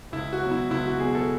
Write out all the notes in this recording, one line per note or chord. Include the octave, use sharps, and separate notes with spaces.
C#2 E4
F#4
B2 F#3
E4
C#2 E4
F#4
B2 F#3 G#4
A4